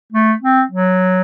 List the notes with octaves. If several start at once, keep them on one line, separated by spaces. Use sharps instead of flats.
A3
C4
F#3